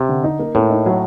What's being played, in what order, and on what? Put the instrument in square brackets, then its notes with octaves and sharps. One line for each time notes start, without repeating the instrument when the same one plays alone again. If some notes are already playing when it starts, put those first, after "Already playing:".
Already playing: [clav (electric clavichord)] C3
[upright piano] D3
D#4
A#3
[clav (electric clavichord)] A2 [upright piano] A#3
[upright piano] D#4
F#3